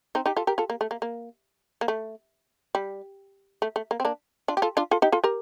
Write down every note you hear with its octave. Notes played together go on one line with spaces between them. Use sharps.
C4 D#4
D#4 G4
F4 A4
G4 A#4
F4 A4
A#3
A3
A#3
A#3
A#3
A3
G3
A3
A3
A#3
C4
A#3 D4
D4 F4
G4
F4 A4
D4 F4
F4 A4
D#4 G4
F4 A4
G4 A#4